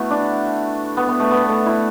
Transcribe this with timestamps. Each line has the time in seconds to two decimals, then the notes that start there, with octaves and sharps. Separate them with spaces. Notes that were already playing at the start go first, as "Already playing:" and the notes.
Already playing: A3 B3 E4 F#4
0.10 D4
0.97 B3
1.08 B3
1.20 A3
1.31 B3
1.43 B3
1.49 A3
1.66 E4